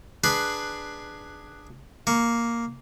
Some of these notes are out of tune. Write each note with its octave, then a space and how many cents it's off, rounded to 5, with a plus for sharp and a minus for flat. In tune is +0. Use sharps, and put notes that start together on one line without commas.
D4 +10 G#4 +0 B4 +0
A#3 +0 C#6 +15